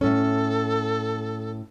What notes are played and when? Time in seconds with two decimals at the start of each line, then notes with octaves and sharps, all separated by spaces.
0.01 A2 C#4 A4